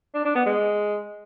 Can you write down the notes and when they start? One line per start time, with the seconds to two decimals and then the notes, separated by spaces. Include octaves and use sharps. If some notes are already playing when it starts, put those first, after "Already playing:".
0.14 D4
0.25 D4
0.35 B3
0.46 G#3